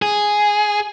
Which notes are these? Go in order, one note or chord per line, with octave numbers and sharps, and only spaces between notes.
G#4